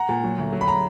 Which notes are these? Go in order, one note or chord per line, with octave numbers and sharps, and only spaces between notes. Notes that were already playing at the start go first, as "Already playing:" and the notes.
Already playing: F#5 A#5
A#2
F#3
D2
F#3
B5
A#5